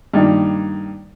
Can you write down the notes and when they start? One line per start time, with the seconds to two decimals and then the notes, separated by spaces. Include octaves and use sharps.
0.14 G2 D#3 A#3